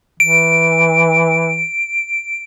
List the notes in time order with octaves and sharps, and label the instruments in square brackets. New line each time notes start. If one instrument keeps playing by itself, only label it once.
[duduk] E3 [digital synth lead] D7